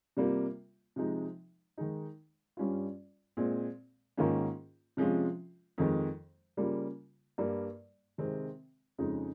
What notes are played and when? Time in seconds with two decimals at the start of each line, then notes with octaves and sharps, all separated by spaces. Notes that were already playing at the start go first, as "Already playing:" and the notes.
0.17 C3 G3 A#3 F4
0.96 C3 F3 G#3 D#4
1.78 D#3 G#3 D#4
2.57 G2 G3 C#4 F4
3.37 A#2 G#3 C4
4.17 G#2 D#3 A#3 C#4 F4
4.97 C3 F3 G#3 C#4 F4
5.78 F2 D#3 G#3
6.57 C#3 G3 A#3 F4
7.38 G2 G3 A#3
8.18 C3 D#3 G#3 C4
8.98 F2 C#3 G#3 D#4